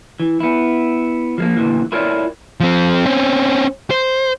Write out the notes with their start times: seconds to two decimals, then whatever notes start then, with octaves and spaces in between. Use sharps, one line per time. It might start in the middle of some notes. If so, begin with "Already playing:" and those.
0.20 E3
0.40 B3 E4
1.38 F3 G#3 A#3
1.57 D2 A#2 E3
1.92 E4 F4 A#4 C#5 D5
2.60 F3 C4
3.06 C4 C#4
3.90 C5